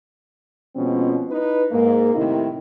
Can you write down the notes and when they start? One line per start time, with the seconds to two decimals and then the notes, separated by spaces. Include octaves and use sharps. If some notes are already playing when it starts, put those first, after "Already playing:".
0.76 B2 F3 G#3 C4 C#4
1.30 D#4 E4 B4
1.72 G#2 A#3
2.15 A2 C3 D#3 D#4 E4